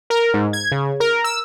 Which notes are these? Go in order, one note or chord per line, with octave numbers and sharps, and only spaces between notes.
A#4
G#2
G#6
C#3
A#4
E6